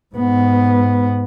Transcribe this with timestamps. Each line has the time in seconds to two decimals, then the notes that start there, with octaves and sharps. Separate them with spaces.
0.15 G#2 B3